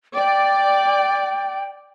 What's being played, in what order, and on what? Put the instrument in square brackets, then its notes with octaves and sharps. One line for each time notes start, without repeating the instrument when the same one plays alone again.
[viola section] D5 [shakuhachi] G5